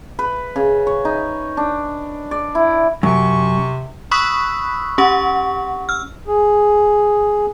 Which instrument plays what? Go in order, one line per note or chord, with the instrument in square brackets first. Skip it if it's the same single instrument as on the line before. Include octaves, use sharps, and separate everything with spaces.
[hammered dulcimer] B4
C#3
C#5
D#4
D4
D5
E4
[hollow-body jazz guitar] F#2 [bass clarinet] C3 [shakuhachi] C#6
[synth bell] B5 C#6 D#6 E6 F#6 B6
C#4 G4 F#5 C#6
E6 F6
[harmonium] G#4